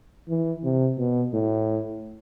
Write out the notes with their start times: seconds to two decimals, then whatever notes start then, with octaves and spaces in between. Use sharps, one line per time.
0.29 E3
0.64 C3
0.98 B2
1.33 A2